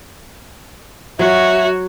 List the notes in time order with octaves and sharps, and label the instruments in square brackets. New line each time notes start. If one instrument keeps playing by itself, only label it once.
[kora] F#3 [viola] F#4 C#5 [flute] E5